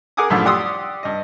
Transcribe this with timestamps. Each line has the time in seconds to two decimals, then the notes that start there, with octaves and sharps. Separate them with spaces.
0.17 G#4 A#4 F#5 G#5 D6 D#6
0.30 C2 F#2 A2 D3 F3
0.45 G4 D5 F#5 C6 D#6 E6
1.03 G2 D#5